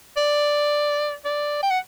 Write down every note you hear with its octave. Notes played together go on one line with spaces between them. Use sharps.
D5
D5
G5
F#5